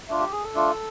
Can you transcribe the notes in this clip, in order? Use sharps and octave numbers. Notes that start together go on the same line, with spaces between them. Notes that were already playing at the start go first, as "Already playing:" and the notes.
A3 D4 F4
G4
G#4
A4
A3 D4 F4